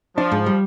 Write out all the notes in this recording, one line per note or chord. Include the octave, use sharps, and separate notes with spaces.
F3 D4
G#2
G3